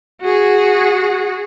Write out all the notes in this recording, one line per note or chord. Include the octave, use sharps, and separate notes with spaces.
F#4 G#4